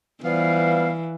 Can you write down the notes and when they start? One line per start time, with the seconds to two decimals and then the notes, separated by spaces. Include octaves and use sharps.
0.24 E3 F3 G3 B3 F5